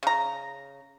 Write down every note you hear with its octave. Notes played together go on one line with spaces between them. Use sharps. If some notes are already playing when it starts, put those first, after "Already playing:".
C#3 A#5